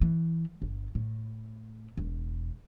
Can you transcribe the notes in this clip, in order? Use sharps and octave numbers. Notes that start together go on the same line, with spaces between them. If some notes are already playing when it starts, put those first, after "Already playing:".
E3
G1
A2
E1